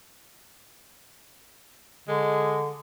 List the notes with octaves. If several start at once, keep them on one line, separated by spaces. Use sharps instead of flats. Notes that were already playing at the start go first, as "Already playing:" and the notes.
D3 G#3